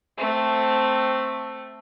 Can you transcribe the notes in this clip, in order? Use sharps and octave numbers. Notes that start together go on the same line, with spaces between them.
A3 C4